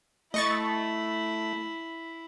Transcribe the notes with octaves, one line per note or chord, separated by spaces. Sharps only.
A3 E4 D#5 C#6 A6